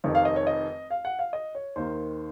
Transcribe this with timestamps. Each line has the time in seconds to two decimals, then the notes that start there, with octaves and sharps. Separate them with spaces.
0.04 F1 F2 D#3
0.15 F5
0.25 D#5
0.36 C#5
0.47 D#5
0.90 F5
1.05 F#5
1.19 F5
1.33 D#5
1.55 C#5
1.76 D#2 D#3 A#3 C5